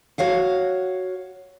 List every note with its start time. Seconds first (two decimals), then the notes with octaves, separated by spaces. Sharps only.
0.18 F#4 C#5 F5 F#5